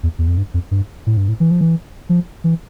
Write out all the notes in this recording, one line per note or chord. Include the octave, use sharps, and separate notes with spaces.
E2
E2
F2
G2
F2
G2
A2
G2
A2
E3
F3
E3
F3
E3